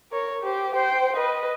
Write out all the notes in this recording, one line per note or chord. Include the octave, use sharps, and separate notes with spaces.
A#4 C#5
G4 C5
C5 G5
B4 D#5